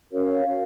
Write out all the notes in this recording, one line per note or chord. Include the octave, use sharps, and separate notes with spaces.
C#4 F#4 A#4 C#5 F5
C#4 F#4 A#4 C#5